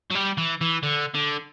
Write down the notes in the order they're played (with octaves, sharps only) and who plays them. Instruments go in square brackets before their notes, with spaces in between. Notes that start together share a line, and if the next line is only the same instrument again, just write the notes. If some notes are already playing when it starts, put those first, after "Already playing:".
[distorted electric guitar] F#3
G3
E3
E3
D3
D3